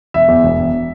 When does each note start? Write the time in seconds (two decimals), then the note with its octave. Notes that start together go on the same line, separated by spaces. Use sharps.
0.14 E1 E5
0.28 E2
0.43 E1
0.58 E1